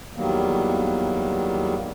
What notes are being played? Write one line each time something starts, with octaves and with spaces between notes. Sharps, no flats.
E2 D#3 F#3 G3 A#3 B3